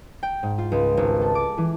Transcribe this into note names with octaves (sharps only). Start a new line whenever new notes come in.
G5
G#2
F4
C#2
G#1
A4
D6
E3